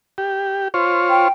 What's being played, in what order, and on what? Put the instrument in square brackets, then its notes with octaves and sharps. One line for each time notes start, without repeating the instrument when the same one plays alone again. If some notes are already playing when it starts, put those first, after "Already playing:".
[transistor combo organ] G4
F4 C5 C#5
[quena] G5